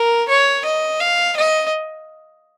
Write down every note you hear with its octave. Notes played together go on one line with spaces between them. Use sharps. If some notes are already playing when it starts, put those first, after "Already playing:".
Already playing: A#4
C#5
D#5
F5
D#5